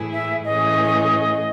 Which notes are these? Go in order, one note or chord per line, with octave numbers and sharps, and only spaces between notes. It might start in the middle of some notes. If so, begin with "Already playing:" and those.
Already playing: A2 E3 A3 E4 G#4
E5
A2 E3 A3 C#4 G#4 D#5